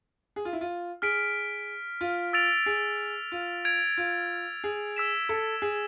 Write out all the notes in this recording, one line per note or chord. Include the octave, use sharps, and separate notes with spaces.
G#4
F4
E4
F4
G#4 F6 B6 D7
F4
E6 A6 D7 F7
G#4
F4
G#6 D7 F7
F4
G#4
E6 B6 E7
A4
G#4